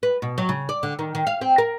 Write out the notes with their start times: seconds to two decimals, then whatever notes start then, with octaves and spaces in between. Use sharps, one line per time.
0.03 B4
0.22 B2
0.38 F#3
0.49 C#3
0.69 D5
0.83 D3
0.99 D#3
1.15 D#3
1.27 F5
1.41 C4
1.58 A#4